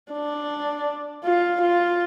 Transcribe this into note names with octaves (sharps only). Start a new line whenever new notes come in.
D4
F4
F4